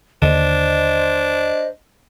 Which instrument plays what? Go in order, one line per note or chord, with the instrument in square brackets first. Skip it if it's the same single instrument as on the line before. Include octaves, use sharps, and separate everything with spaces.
[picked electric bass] D#2 D3 [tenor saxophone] D4 [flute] C5 [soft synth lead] D#5